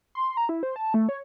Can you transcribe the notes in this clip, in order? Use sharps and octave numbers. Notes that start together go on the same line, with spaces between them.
C6
A#5
E4
C5
A5
A3
C#5